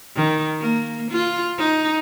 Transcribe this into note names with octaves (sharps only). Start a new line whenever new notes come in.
D#3
A#3
F4
D#4